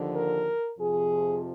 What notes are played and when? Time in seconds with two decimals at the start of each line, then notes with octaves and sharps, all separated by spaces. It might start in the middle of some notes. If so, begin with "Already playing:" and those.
Already playing: D#2 D3 F3
0.14 A#4
0.78 F2 C3 F3 G#4